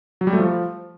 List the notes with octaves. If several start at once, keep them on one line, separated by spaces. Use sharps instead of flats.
F#3
G3
A3
F3